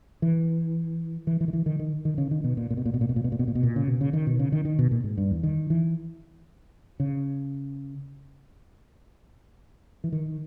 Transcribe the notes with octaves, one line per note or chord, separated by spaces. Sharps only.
E3
E3
E3
D#3
E3
D#3
D#3
D#3
C#3
D#3
B2
A#2
A#2
B2
A#2
B2
A#2
B2
A#2
B2
A#2
B2
A#2
B2
A#2
C#3
B2
C#3
D#3
B2
C#3
D#3
D#3
B2
A#2
G#2
G2
E2
D#3
E3
C#3
E3
D#3